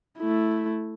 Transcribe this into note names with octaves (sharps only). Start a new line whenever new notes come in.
A3 E4